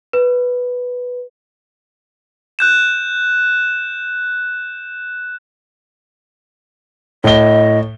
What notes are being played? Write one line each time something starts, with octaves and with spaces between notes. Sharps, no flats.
B4
F#6 G6 E7
A2 D#5 G7